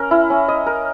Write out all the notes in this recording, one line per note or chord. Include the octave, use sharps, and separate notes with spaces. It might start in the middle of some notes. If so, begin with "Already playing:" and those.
Already playing: C#4 A#4
E4
C#4
D#5
A#4